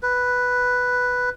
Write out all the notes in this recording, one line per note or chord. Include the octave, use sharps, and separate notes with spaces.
B4